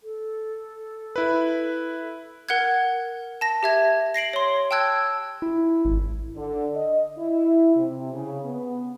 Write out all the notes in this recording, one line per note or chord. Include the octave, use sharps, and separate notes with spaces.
A4
E4 B4
A#4 F#5 F#6 G#6
A5 A#6
G4 E5 G#6
A#6 C7 D7 F#7
C#5 C6
G5 A5 E6 F#6 G#6
E4
G#1
D3
D#5
E4
C3
C#3
B3